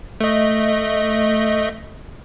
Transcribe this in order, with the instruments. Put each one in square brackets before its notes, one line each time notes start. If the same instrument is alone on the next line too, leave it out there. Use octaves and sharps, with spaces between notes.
[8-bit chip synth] A3 D#5